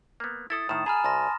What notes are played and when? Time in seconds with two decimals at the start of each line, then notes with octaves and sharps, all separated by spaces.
0.20 A#3 B3
0.50 E4 A4 D#6 A6
0.69 A2 D#3 E7
0.86 G#4 G#5 A#5 B5 F6
1.04 C2 A5 C6 A#6